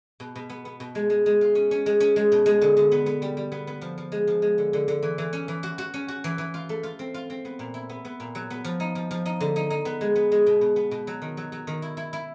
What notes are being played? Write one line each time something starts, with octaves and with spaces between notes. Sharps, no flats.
B2
B2
B3
B3
B2
G#3
G#3
G#3
F4
C#4
C#4
G#3
C#4
G#3
B2
G#3
D3
D3
B3
B3
G3
G3
B3
B3
F3
F3
G#3
F3
G#3
D3
D3
D3
E3
E3
C#4
E3
F#4
F#4
C#4
F#4
E3
E3
F4
A3
F4
C4
F4
C4
B3
A#2
E4
B3
B3
A#2
F#3
B3
F3
D#4
F3
F3
D#4
D3
D#4
D#4
B3
G#3
B3
G#3
B2
B2
B3
B2
F#3
D#3
F#3
F#3
D#3
E4
E4
E4